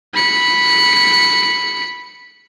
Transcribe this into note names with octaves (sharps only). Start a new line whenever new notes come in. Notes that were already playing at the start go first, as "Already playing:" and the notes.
B5 C#7